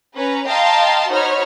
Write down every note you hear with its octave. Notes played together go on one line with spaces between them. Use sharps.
C#4 B4 A#5
D#5 F5 G5 A5 A#5 C6
D#4 F#4 C5 C#5 B5 F6